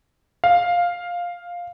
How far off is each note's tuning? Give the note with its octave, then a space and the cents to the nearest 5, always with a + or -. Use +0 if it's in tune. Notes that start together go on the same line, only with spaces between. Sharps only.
F5 +5